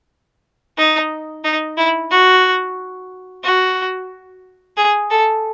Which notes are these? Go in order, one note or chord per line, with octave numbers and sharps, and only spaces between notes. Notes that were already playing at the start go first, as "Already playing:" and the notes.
D#4
D#4
E4
F#4
F#4
G#4
A4